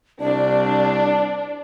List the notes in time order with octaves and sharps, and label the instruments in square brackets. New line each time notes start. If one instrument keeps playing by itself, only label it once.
[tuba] C2 [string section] D4 [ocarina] D5